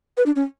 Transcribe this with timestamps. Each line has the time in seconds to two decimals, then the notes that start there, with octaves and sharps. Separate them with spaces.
0.17 B4
0.26 D4
0.36 C#4